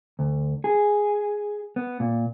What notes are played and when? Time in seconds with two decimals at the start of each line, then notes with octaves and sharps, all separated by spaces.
0.19 D2
0.64 G#4
1.76 B3
2.00 A#2